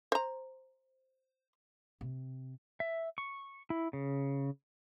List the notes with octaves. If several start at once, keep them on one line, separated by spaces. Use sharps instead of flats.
C5 A#5
C3
E5
C#6
E4
C#3